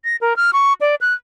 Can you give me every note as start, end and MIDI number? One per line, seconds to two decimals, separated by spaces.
0.04 0.16 94
0.21 0.36 70
0.36 0.51 89
0.53 0.73 85
0.81 0.95 74
1.01 1.14 90